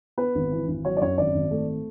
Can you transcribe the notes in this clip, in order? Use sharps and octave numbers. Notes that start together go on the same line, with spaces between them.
B3 B4
G#1
E3
G#1
F#3 C#5
D5
F#2 C#5
G#1 D5
G#1
A3